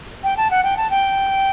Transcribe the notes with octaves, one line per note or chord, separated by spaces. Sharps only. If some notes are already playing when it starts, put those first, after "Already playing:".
G5
A5
F#5
G5
A5
G5